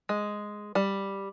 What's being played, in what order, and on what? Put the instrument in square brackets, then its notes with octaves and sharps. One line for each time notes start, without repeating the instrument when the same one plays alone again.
[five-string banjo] G#3
G3